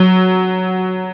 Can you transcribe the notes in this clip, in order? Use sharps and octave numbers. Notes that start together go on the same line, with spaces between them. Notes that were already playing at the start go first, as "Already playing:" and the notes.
Already playing: F#3